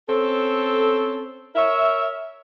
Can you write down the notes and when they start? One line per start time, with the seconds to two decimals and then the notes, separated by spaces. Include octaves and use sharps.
0.08 C4 C#4 A4
1.56 A#4 C#5 E5